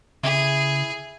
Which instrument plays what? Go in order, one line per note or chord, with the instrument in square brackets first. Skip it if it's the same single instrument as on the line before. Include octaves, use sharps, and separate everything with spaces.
[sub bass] C#3 [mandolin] E4 [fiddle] G#4